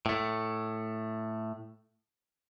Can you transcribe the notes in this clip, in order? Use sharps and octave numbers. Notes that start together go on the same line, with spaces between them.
A2 A3